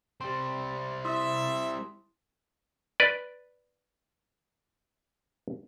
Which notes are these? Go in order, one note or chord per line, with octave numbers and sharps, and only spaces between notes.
G3 C4 C6
E4 E5 C6 D#6
B4 D5